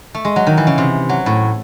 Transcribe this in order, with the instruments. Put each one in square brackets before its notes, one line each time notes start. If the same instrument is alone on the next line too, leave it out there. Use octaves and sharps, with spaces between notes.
[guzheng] A3
G#3
F#3
D#3
E3
C#3
C3
F#3
A2